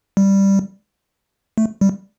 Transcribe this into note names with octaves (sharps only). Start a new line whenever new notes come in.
G3
A3
G3